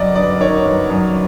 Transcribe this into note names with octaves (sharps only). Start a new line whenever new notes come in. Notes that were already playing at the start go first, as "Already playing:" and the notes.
Already playing: G1 F#2 D5 D#5
G1 D5
D#3 C#5
G1
F#2